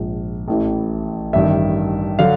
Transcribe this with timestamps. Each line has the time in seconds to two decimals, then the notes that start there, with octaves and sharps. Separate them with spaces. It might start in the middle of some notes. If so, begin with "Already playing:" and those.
Already playing: A#1 G#2 F3
0.48 A1 A2 E3
1.33 A1 G2 D#3 E5
2.19 D3 F#3 F5